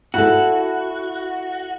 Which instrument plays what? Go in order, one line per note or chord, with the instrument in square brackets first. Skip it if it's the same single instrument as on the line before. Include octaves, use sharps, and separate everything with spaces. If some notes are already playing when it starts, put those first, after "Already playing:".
[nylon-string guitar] E4 A4 [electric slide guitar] F#4